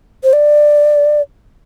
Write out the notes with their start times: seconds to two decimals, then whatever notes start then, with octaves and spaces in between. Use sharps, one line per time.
0.24 C5
0.33 D5